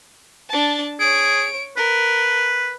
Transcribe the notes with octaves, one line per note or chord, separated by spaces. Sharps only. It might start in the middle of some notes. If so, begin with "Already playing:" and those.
D4 A5
G#4 C#5 D7
A#4 B4